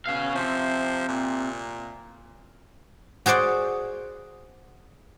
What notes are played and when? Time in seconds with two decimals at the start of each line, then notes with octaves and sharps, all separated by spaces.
0.06 B2 C#4 F5
0.35 C3 F3
1.08 A#2
3.26 F#4 G#4 C5 D5 F#5